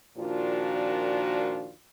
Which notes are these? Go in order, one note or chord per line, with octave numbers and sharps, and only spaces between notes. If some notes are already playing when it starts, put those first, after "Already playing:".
A#2 D#3 F3 D4 F4 F#4